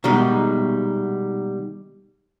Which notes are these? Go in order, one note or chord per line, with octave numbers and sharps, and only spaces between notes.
B2 D#3 G3 G#3 D#4